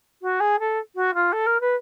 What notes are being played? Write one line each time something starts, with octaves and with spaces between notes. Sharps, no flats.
F#4
G#4
A4
F#4
F4
A4
A#4
B4